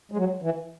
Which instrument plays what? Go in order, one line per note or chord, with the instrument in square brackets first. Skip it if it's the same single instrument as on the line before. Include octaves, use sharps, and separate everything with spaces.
[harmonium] G#3
F#3
E3